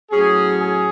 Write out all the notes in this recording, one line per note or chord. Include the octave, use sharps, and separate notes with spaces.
A2 F#3 C#4 G#4
G#4